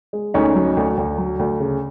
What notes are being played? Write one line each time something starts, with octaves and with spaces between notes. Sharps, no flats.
G#3
D2 C#4 D#4
F#3
D2
D2
F#3
D2
C#3